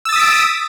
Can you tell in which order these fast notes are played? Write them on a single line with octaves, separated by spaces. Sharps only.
E6 A6 D#6 B6 D7